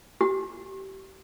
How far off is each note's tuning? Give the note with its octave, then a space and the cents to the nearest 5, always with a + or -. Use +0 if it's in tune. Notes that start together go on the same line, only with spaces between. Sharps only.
G4 -30